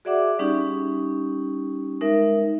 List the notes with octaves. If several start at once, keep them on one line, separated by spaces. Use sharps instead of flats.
F#4 G#4 D5 E5 F#5 D6
G3 C#4 D#4 G4
G#3 D#4 A#4 E5